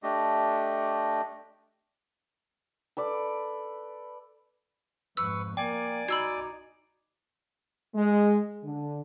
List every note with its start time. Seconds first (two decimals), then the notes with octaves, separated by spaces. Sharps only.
0.03 A3 D4 G4 D#5
2.97 A4 B4 D5
5.17 F2 G#2 B4 C#6 E6
5.57 A#3 D5 G5 G#5 D6
6.08 D#4 F#4 B5 E6 G#6
7.94 G#3
8.63 D3